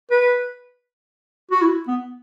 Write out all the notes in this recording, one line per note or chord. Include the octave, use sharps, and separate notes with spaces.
B4
F#4
E4
B3